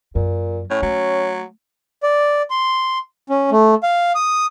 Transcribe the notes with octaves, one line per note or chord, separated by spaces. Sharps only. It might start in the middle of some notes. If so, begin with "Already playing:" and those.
F#2 A#2
A2 C#4
F#3 A3
D5
C6
C#4
A3
F5
D#6